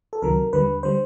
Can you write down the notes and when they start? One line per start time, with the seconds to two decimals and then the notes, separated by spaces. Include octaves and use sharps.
0.13 A4
0.22 C#2 C3 D#3 F#3 A#4
0.53 D#2 D3 G3 B4
0.83 D3 G3 C5